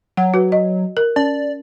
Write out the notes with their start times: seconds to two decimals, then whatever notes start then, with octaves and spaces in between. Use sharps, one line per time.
0.17 F#3 F#5
0.34 F#4 B4
0.52 D#5
0.97 A#4
1.16 C#4 D5